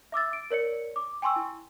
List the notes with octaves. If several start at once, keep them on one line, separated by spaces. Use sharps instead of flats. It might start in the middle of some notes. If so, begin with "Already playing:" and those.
E5 D6 E6 A6
D7
A#4 C#5 D5 C#7
D6
G5 G#5 C6 C#6 E6
E4